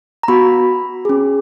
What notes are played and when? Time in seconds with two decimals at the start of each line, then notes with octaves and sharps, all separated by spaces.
0.23 A#5
0.28 B3 F#4 B5
1.05 C#4 G#4